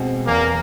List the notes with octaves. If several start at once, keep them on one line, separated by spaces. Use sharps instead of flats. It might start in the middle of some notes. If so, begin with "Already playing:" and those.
Already playing: B2 G#3 C4
E2 A#3